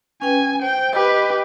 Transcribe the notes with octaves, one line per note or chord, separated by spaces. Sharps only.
C#4 B4 G5 G#5
C5 G5
G4 B4 D#5